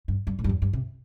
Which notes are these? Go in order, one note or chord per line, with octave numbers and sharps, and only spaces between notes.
G2
G2
A2
G2
E2
G2
C3